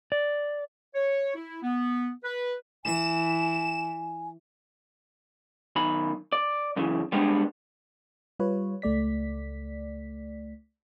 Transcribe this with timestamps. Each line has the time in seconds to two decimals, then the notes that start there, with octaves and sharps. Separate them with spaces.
0.12 D5
0.93 C#5
1.35 E4
1.62 B3
2.23 B4
2.85 E3 G#5 E7
5.76 B1 D#3 B5
6.32 D5
6.76 F#2 C#3 E3
7.12 G3 G#3 B3 C4 D4
8.39 G3 F4 B4 C#5
8.82 C#2 A3 D5 B6